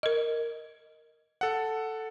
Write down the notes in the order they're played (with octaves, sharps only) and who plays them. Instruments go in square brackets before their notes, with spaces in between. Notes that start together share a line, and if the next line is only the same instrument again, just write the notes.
[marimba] A#4 D#5
[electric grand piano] A4 F#5